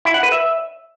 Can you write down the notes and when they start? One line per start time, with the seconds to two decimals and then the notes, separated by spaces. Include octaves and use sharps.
0.05 E4
0.14 F#5
0.23 B4
0.32 E5